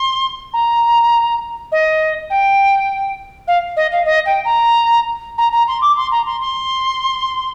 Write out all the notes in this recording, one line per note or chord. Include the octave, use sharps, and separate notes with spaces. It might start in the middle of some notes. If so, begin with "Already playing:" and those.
Already playing: C6
A#5
D#5
G5
F5
D#5
F5
D#5
G5
A#5
A#5
A#5
C6
D6
C6
A#5
C6
C6